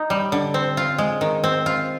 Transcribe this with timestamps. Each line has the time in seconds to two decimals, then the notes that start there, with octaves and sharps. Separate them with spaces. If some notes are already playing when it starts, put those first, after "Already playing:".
Already playing: D#4
0.10 G3
0.32 D3
0.54 C4
0.77 F4
0.98 G#3
1.21 D#3
1.44 C4
1.66 F4